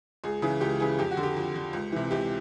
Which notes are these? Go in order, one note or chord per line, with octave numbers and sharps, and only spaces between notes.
C#2 G#4
C#3 E3 G#4
C#2 G4
C#3 E3 G#4
F2 G4
F#4
D3
G4
F2
D3
C#2
C3 E3
C#2 G4